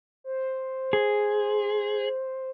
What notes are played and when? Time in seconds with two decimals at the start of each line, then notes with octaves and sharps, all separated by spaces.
0.24 C5
0.93 G#4